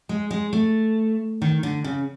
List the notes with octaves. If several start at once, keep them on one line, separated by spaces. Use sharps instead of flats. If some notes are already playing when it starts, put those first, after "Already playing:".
G#3
G#3
A3
D#3
D3
C#3